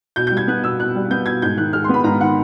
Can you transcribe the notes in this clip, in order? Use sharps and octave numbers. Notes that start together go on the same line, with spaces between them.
B2 G6
G6
G3
G#6
B3 F#6
B2 E6
B2 F#6
G3
B3 G6
B2 G#6
G#2 G6
D#3 F#6
G#3 F6
C6
B3 B5
G#2 A#5
D#3 F#5